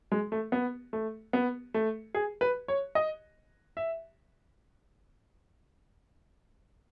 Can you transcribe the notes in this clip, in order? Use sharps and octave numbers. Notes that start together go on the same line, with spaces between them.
G#3
A3
B3
A3
B3
A3
G#4
B4
C#5
D#5
E5